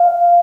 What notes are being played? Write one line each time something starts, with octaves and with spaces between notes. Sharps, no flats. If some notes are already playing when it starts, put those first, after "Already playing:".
Already playing: F5